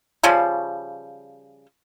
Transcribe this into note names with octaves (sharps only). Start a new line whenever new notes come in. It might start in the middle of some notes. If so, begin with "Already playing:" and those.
C#3 F3 G3